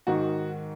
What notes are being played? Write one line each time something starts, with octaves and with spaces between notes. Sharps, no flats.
G#2 D#3 F#4